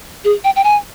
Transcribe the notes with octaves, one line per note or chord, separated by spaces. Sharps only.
G#4
G5
G5
G#5